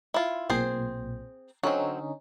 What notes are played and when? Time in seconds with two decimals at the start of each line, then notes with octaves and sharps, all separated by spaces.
0.14 E4 F4
0.50 B1 A#2 C4 G#4 C5
1.63 D3 F#3 C4 C#4 D#4